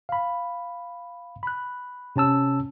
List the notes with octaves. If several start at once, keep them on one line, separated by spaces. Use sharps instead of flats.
F5 B5
B5 F#6
C3 C#4 A5 E6